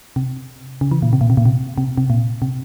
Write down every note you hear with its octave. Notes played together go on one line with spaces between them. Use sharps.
C3
C#3
E3
A#2
C3
A#2
C3
A#2
C3
C3
C3
A#2
C3